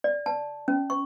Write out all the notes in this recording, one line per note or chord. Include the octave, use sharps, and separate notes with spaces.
D5
A5
C#4
C#6